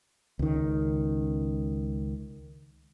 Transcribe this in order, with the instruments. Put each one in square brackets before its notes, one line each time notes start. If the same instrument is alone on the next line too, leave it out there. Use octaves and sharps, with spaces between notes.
[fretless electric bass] C#2 D#3